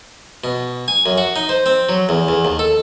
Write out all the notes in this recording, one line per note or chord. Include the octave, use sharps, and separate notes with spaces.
B2
G#5
F#2
F#4
D#4
C5
C4
F#3
E2
E2
D#2
A4